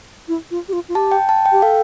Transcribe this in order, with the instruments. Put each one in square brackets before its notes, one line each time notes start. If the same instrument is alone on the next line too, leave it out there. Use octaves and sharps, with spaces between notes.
[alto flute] E4
F4
G4
F4
F4
[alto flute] G4 [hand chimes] A5
[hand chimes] G5
A5
G5
[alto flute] G4
[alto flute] A4 [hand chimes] F5